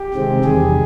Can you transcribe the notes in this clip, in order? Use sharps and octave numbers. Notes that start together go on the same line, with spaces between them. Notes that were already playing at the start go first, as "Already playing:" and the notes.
Already playing: G4
C3 D#3 G#3 C4
E2 C3 D#3 G3 G#4